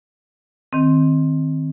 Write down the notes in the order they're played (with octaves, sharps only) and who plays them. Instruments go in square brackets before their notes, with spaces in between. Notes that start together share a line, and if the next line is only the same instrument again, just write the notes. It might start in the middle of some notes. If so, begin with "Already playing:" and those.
[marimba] D#3 C4